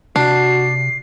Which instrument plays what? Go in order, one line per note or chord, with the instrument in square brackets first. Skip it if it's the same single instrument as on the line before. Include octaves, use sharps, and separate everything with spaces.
[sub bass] C3 [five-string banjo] D4 [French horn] F#4 [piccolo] C7